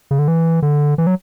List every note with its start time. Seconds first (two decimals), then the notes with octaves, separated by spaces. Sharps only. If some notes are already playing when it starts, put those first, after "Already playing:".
0.11 C#3
0.19 D3
0.28 E3
0.62 D3
0.98 E3
1.07 F#3